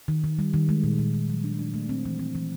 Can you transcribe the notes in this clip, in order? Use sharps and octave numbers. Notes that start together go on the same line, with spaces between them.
D#3
D#3
G3
D#3
G#3
A#2
A#2
A#2
F#3
D4
D4
A3
C4
E3
C4
E3